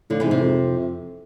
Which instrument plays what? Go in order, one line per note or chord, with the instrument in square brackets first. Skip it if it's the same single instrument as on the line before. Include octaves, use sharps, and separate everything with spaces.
[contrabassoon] A2 [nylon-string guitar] D3 F3
[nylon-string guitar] C3 E3
[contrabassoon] G#2
[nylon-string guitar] C3
[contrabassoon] F2